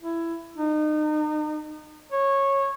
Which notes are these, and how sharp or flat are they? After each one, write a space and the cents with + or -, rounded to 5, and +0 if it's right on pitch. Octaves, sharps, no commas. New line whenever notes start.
E4 +15
D#4 -35
C#5 -15